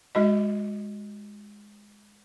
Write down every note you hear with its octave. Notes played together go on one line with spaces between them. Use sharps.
G#3 F#4 D#5